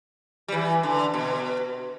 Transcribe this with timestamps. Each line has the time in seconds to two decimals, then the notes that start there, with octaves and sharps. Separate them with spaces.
0.48 G3
0.52 E3
0.83 D3
1.14 B2